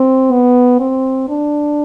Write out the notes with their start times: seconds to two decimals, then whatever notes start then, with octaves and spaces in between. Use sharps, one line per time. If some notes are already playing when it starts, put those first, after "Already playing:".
Already playing: C4
0.32 B3
0.80 C4
1.29 D4